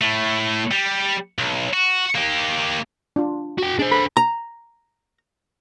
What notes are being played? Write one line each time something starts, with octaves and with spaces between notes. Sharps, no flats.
A2 A3
G3
B1
F#4
A#3 G4
D4 F4
F#4 G5
D4 G#4 C5
A4 B5
A#5